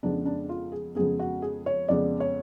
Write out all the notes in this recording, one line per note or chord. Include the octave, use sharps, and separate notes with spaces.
F2 C#3 G#3 B3 D4
D4
F4
G#4
F2 C#3 G#3 B3 G#4
F#4
G#4
C#5
F2 C#3 G#3 B3 D5
C#5